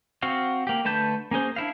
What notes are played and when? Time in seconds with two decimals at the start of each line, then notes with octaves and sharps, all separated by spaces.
0.22 C4 F#4 F5
0.67 A#3 G4
0.85 D3 A3 B4 A5 G6
1.31 A#3 C#4 G#4 C5
1.56 D4 E4 F5